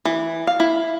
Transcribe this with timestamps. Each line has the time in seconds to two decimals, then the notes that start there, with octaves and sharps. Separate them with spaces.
0.05 E3
0.47 F5
0.60 E4